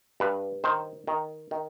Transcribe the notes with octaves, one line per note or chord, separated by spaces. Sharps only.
G2 B4
D#3 C5
D#3
D#3